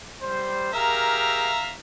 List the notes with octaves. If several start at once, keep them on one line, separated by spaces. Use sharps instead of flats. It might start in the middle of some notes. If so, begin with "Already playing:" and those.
G3 C5
G4 G#4 A#4 E5 F5 A#5